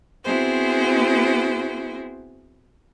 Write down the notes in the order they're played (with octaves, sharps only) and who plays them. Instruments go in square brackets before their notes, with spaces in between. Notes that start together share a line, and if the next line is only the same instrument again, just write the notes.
[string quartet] B3 C4 E4 F#4 G#4 C5